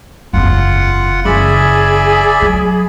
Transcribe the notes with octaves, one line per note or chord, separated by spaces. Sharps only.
F#1 E2 F4 F#5
F#1 E3 G#4 D5 E5 B5
F#3